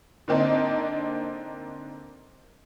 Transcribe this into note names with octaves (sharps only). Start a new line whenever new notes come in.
D3 A#3 C4 D4 D#4